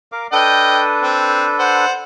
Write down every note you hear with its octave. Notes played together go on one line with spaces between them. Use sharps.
A#4 F5 D6
D4 A4 B4 D#5 G5
C4
C5 F#5